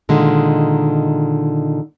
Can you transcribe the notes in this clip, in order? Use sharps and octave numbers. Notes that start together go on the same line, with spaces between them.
A#2 D3 D#3 G#3